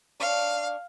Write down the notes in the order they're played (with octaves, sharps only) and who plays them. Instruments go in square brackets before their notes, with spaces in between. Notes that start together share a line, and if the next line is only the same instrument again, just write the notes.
[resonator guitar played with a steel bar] D4 C#5 [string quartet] F5